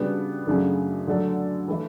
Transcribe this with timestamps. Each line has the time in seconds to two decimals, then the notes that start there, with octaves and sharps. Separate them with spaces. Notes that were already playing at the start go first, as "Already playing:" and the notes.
Already playing: C#3 G3 B3 D4 F#4
0.46 F#2 C#3 F#3 A3 D4
1.07 D3 F#3 A3 D4 A4
1.68 E3 A3 E4